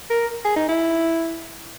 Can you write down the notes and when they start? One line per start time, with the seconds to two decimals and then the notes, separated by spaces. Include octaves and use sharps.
0.10 A#4
0.45 G#4
0.56 D#4
0.68 E4